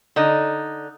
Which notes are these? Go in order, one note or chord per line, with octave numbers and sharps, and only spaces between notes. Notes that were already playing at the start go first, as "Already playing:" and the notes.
D3 D#4